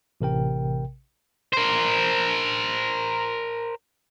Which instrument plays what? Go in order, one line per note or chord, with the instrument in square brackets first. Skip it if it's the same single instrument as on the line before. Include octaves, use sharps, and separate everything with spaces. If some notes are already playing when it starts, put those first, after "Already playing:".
[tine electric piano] A1 C3 A#4 G5
[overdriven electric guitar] A#4 C5